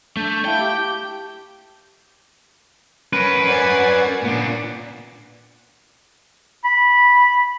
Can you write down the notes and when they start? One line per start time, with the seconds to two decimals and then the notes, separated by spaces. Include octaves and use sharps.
0.17 A3 D4 G6
0.45 E4 E5 F5 G5 A5
0.60 G4 D6
3.13 C#4 A#4 B4
3.46 D5 F#5 G#5
4.24 A#2 B3 D4
6.64 B5